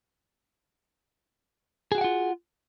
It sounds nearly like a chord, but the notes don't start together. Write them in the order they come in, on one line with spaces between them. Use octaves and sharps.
G#4 F#4 G5 F#5 F4